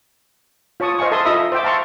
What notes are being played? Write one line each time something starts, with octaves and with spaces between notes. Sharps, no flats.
F4 C#5 A5 C#6 D#6
C5 D#5 F5 G#5 C#6
A4 E5 A5 C6 D#6
F4 D#5 E5 A#5 B5 D#6
C5 E5 G5 D6
F5 A5 A#5 C6 C#6